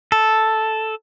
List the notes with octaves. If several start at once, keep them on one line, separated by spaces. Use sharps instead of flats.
A4